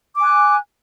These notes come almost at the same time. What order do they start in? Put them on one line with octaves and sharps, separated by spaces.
D6 G#5 F#6